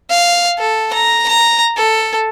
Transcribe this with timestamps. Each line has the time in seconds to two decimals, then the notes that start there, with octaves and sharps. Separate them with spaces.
0.10 F5
0.59 A4
0.93 A#5
1.29 A#5
1.77 A4